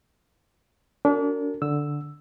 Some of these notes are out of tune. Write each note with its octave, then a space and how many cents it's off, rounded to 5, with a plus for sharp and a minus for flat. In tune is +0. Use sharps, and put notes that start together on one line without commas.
D4 -35 F#4 -10 A#4 -35
D3 +0 E6 +0